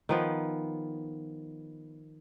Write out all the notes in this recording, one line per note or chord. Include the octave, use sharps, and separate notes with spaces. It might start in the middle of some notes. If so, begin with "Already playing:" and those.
D#3 F3 B3